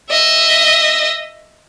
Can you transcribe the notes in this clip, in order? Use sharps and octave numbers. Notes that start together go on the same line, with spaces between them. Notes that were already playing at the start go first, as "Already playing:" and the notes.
D#5 E5